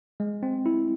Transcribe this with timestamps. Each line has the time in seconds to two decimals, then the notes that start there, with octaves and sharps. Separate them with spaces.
0.20 G#3
0.43 C4
0.66 E4